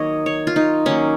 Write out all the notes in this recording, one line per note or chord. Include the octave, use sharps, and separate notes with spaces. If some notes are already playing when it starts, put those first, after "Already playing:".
Already playing: D#3 F#3 A#3 C#5 D#5
C#5
F4
D#4
D#3 F#3 A#3 C#4